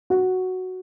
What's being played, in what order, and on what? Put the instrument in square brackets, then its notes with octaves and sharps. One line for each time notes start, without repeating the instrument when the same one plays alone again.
[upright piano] F#4